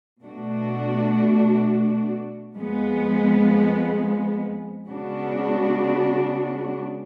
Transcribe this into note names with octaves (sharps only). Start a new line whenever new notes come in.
B2 A3 D4 F#4
F2 F3 G#3 B3
C#3 G#3 B3 D4 F#4